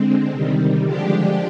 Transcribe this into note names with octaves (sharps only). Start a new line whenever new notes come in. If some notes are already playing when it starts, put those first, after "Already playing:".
Already playing: D3 G#3 C4
C3 D#3 G3
D3 F3 G#3 D4 G4